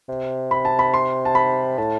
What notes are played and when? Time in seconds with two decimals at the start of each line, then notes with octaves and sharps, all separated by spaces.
0.09 C3
0.51 B5
0.65 A5
0.79 B5
0.94 C6
1.25 A5
1.35 B5
1.78 A2 A5